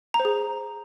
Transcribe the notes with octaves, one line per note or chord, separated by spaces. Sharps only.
A#5
C5
G#4